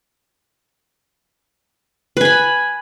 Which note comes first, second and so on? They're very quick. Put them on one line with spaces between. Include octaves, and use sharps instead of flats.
B4 G#5 B5